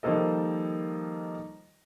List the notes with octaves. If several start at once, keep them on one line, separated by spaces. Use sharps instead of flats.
D#3 F3 G3 A#3 A4 D#5